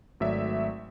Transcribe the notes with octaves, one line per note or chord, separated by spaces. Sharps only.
G#1 F#3 A3 D5 E5